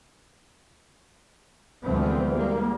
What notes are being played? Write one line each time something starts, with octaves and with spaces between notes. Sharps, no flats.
D2 E3 F3 G#3 B3 C4
G3 G#3 A#3